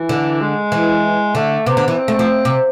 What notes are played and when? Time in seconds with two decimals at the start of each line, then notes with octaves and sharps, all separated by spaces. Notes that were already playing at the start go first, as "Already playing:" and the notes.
Already playing: E3
0.09 D3
0.41 G#3
0.72 E3
1.35 D3 A3
1.66 C3 B3
1.77 D3
1.88 E3
1.98 C4
2.08 A3
2.19 F3
2.45 C3